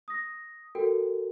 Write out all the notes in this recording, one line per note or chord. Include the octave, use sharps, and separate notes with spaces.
D#6 A#6
F#4 A4 A#4 G5